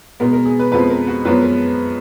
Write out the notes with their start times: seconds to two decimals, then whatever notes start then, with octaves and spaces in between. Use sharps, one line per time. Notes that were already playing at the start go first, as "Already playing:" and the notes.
0.20 B2 G#3 B3 A#4
0.33 A#4
0.46 G#4
0.59 B4
0.72 F2 F3 G#3 B3 B4
0.90 A#4
1.07 F#4
1.25 F#2 F3 G#3 B3 B4
1.42 A#4